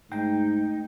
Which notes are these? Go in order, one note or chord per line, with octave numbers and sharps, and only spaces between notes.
G#2 A3 D#4 G5 G6